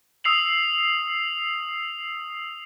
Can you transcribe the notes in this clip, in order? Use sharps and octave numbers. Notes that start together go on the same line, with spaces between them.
D#6 E6 C7 F7 F#7